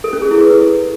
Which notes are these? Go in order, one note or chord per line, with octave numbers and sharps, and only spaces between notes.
A4
C#4
G#4
E4
B4